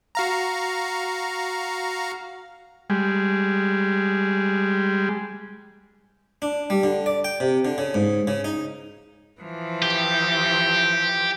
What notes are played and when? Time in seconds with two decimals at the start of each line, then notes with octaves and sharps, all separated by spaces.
0.15 F#4 F5 A#5
2.90 G3 G#3
6.42 D4
6.70 G3
6.84 D3
7.06 D5
7.24 G5
7.40 C3
7.65 D3
7.78 C#3
7.94 G#2
8.27 C#3
8.44 D#4
9.41 E3 F3
9.82 G4